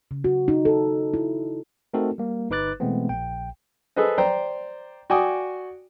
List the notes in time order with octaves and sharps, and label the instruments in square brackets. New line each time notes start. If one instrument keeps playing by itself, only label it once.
[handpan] C#3
F#4
D#4
A4
E4
[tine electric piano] A3 C4 D#4 F#4 A4 A#4
G3 A#3
G1 D#4 B4 D6 F#6 A6
B2 E3 G#3 A3 B3 C4
A#1 G5
[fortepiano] G#4 A4 B4 C5 D#5
C5 D5 G5 A#5
F#4 D5 G5 G#5 D6 D#6